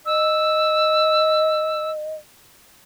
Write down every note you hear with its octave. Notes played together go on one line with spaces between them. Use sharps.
D#5 E6